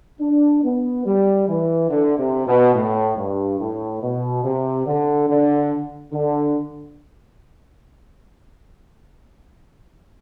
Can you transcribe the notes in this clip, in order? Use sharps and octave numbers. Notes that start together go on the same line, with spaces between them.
D4
B3
G3
E3
D3
C3
B2
A2
G2
A2
B2
C3
D3
D3
D3